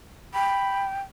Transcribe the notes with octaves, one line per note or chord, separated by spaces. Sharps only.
G5 B5